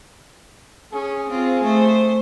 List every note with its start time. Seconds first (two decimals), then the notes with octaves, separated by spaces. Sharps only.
0.93 C#4 G#4
1.30 C4 F4
1.64 A3 C5